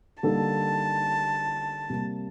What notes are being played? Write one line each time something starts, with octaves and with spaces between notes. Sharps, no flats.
D3 G3 A#3 D#4 A4 A5
C3 G3 A#3